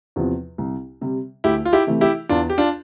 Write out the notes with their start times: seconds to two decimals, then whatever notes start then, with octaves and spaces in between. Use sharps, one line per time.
0.16 E2 C3 F3
0.58 C2
1.01 C3 G3
1.44 D2 E4 G4
1.65 F4
1.73 E4 G4
1.87 C3 E3 A3
2.01 E4 G4
2.29 E2 D4 F4
2.50 G4
2.58 D4 F4